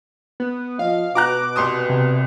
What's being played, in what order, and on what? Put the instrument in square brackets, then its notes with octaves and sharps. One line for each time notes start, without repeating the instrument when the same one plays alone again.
[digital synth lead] B3
[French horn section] F3 D#5 [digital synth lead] F5
[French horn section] B2 [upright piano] F#4 A#5 F#6 [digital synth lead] D6
[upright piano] C2 C6 D#6
[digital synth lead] C3